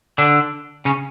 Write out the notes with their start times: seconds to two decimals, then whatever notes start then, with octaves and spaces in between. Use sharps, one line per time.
0.18 D3 D4
0.85 C#3 C#4